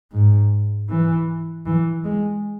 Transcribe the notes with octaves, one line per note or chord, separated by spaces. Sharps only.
G#2
E3
E3
G#3